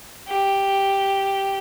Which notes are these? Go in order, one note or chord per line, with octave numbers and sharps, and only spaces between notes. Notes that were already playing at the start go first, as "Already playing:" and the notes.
G4